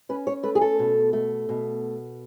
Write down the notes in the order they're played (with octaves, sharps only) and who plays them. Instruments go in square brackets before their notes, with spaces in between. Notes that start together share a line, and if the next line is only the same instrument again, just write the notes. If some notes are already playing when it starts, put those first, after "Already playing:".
[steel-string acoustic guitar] C#4 B4
C#5
A3 B4
G#4
A4
B2
A3
B2